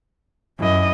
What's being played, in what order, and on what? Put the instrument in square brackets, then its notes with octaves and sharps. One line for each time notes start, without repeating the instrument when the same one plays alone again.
[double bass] F#2 [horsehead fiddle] E4 D#5